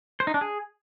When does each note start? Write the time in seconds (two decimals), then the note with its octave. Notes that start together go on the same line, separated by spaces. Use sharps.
0.20 C5
0.27 D#4
0.34 D4
0.41 G#4